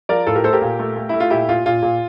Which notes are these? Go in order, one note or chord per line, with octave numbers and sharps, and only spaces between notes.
F3 A#4 D5
A2 F4 A4
G4 A#4
A3 A4 C5
G4 A#4
A#2
A3
A3
A3 E4
F4
A#2 E4 G4
A#2 F4
A#2 F4
A#2